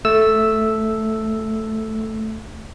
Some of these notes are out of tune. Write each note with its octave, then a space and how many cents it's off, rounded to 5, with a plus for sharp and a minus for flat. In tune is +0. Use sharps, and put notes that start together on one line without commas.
A3 +0 E6 +0